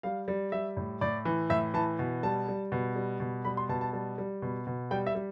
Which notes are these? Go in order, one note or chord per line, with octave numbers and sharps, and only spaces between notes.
G3 F5
G3
G3 E5
A2
A2 D5
E3
A2 E5
E3 A5
B2
G3 A5
G3
B2
G3
B2
G3 B5
C6
B2 A5
A5
G3 A5
G3
B2
B2
G3 G5
E5
G3